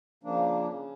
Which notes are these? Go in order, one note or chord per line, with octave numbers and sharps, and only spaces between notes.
C#3 F3 A#3 D4
C#3